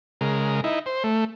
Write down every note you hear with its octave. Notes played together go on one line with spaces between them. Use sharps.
C#3 G#3 A#4
D#4 E4
C5
A3